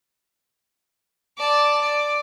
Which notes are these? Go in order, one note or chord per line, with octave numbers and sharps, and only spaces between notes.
D5 A5
D5